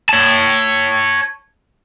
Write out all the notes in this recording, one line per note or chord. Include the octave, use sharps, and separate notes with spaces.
C#5 A5